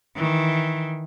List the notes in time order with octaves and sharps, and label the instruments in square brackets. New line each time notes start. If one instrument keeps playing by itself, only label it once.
[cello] D#3 E3